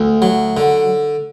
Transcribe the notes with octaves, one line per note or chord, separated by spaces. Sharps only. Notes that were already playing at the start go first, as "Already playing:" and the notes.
Already playing: D2
F#3
D3